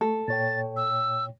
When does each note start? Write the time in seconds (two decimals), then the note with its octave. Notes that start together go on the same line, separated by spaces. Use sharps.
0.01 A3 A4
0.28 A#2 C#5 G5 A6
0.77 E6